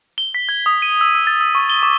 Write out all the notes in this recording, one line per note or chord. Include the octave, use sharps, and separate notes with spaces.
G7
B6
G#6
D#6
D#7
E6
E6
A6
E6
C#6
G7
D6